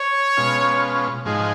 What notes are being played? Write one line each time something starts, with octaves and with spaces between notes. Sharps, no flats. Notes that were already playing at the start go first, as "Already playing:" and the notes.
Already playing: C#5
B2 G#3 C#4 F4
G#2 F3 G#3 D#4 G#4